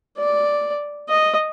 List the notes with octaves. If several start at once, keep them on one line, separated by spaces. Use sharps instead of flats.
D5
D#5